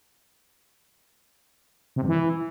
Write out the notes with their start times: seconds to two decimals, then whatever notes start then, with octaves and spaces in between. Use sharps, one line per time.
1.96 C3
2.02 G2
2.08 E3